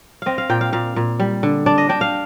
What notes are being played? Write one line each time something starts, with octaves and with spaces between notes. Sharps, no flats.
C4 D#5 F5
F5
A#2 G5
F5
A#2 F5
A#2
G3
D3
D4 D5
D#5
D4 G5
F5